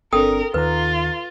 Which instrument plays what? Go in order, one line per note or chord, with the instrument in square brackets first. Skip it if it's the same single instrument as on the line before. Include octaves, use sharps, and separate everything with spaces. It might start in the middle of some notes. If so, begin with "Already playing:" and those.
[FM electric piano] G1 C4 D4 [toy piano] A4 G5 D#6 [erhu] A#4
[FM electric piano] D#2 D#3 A#5 [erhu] F4 [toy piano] B4